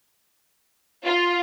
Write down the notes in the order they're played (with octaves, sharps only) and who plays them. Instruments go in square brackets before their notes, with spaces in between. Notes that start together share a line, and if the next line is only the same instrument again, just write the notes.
[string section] F4